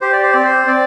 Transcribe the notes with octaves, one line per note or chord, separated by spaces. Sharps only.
G4 C5
D5
C5
C4 D5
C5
C4 D5